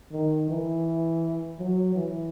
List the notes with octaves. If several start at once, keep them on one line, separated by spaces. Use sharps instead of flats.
D#3
E3
F#3
E3